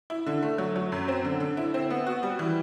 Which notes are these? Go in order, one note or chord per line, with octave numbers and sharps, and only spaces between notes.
E4
D3
A3
F#3
F#3
F#2
C4
D3
D3
E4
C4
B3
F#4
G3
E3